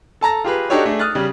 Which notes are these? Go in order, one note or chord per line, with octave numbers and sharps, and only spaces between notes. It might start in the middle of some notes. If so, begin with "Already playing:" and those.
A4 A5 A#5 A#6
F4 G4 G#4 B4
D4 D#4 F#4 G4 A4 C#5
A3 D4 G#4
D#6 F6 F#6 A6
C#3 G3